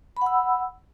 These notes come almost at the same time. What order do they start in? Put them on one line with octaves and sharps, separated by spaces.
B5 F#5 E6